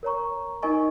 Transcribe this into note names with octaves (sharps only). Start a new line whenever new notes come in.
A#4 C#5 A#5 C#6
D#4 A#4 D#5 G#5 C#6